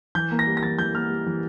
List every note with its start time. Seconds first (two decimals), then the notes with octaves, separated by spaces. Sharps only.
0.15 E3 G6
0.31 A#3
0.39 A#6
0.47 G3
0.57 A#6
0.63 E3 A6
0.79 E3 G6
0.94 A#3 F6
1.10 G3
1.26 E3